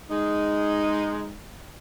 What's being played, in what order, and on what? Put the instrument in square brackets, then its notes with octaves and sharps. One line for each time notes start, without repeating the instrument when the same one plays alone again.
[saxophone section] G#3 D#4